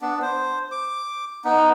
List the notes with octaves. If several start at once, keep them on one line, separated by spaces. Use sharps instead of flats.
B3 D4
C5
D6
B3 D#4